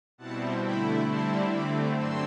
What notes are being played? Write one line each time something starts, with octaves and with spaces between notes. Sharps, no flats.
B2 G3 C4 E4 F#5 A5
D3 A3 E4 G5 B5
D3 G3 C4 E4 A5 C6
D3 A3 C4 B5 D6
G2 D3 F#3 C4 C6 E6